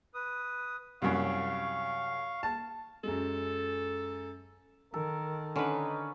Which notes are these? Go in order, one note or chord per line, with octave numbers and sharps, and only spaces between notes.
B4 D#6
C2 F#2 F5 C#6
A5
F#2 G#3 A4
D#3 A4 A#4
D3 C#4 D#4 B4